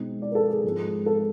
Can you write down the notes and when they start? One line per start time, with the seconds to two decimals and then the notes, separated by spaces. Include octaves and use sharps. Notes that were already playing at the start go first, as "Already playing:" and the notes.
Already playing: B2 G#3 C4 D#4
0.22 D5
0.31 A#4
0.35 A4
0.50 G#4
0.64 G#2 F3 G#3 C4
1.06 A4